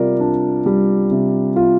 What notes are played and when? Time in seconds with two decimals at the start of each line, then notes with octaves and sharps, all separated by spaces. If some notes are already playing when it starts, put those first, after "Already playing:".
Already playing: C3 G3 F4 A#4 D5
0.20 D4
0.66 G3
1.11 C3
1.56 F4